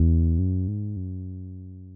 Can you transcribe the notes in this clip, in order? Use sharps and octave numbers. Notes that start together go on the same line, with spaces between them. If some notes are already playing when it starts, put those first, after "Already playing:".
Already playing: E2
F#2
G#2
F#2